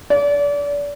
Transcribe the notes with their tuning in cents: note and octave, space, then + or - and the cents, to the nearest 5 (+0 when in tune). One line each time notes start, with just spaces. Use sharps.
D5 -30